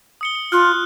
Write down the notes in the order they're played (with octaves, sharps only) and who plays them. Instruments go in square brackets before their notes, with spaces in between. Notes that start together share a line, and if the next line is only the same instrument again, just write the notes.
[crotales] D#6 C#7 G7
[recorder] F4 [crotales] F6 F#6 C#7